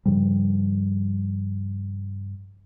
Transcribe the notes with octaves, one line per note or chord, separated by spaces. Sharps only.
G2 C#3 F3 G3